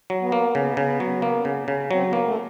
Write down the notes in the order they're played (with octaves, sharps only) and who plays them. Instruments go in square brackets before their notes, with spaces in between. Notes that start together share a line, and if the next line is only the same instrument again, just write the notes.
[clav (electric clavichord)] F#3
[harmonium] B3
[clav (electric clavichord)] A#3
[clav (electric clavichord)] C#3 [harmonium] B3
[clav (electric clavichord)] C#3
F#3
A#3
C#3
C#3
[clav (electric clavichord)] F#3 [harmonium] C4
[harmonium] B3
[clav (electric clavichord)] A#3
[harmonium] A3